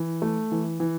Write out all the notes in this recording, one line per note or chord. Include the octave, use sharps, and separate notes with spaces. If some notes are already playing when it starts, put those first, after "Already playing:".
Already playing: E3
A3
E3
E3